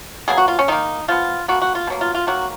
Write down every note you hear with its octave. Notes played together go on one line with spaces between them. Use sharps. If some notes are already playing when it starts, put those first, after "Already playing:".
B2 F#3 A#3 G#4
F#4
F4
C#4
D#3 A#3 D#4
F3 B3 F4
B2 A#3 F#4
F#4
F4
B2 F#3 A#3
F4
F4
D#3 F#3 A#3 F#4